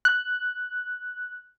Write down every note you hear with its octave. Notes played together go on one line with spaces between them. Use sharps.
F#6